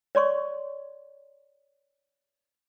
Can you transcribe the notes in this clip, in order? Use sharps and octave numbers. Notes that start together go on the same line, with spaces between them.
C#5 D5 C6 C#6